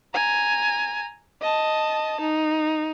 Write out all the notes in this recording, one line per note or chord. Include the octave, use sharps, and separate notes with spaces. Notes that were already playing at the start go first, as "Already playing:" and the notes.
G#5 A#5
D#5 A5
D#4